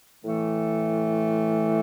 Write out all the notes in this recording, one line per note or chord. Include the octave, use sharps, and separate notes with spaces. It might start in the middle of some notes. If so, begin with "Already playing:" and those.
A2 E3 A3